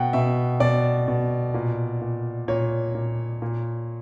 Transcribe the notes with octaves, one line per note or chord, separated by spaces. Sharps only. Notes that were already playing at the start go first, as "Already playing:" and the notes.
Already playing: B2 F#5 G5
B2 E5
B2 D5
B2
A#2
A#2
A#2 C#5
A#2
A#2